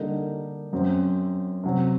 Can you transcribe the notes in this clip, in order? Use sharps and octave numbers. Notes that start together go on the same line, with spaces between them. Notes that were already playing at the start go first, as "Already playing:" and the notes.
Already playing: D3 G3 A#3 D#4
F#2 F#3 C4
C3 F#3 C4